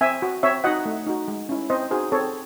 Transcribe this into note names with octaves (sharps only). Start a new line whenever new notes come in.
C4 E5 G#5
F#4
C4 C#5 E5
D#4 F#4 D#5 F#5
A3
D#4 F#4
G#3
C#4 E4
C4 C5 D#5
D#4 F#4 G#4 C5
C4 A4 C#5